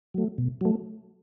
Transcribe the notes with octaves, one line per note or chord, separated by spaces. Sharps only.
F#3 A3
B2
F#3 A3